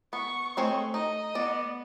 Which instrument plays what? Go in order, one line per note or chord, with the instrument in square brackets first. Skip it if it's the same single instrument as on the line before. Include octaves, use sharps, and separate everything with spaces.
[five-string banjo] B3 [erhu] C#6
[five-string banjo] G#3 C4 C#5 [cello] A3
[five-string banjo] D#4 [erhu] D#5
[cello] B3 [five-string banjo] D5